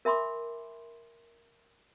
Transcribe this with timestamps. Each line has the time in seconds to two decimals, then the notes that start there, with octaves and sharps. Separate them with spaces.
0.05 A#4 E5 G#5 B5 C6 D6